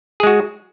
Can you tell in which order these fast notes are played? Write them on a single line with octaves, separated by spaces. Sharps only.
G#4 G#3 F#4